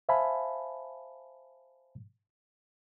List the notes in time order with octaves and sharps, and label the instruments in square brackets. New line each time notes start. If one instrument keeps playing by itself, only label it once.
[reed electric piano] C5 E5 F5 G#5 A5 B5